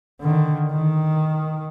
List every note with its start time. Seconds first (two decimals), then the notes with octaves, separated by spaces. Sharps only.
0.21 D3 D#3
0.71 D#3